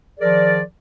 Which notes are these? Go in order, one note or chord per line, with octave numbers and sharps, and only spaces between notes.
D#3 F3 G#4 A#4 D5